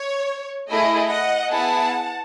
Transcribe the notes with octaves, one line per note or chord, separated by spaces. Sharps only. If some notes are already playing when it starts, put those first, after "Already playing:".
Already playing: C#5
A3 E4 G#4 D#5
D#5 F#5
B3 E4 G#4 F#5 A5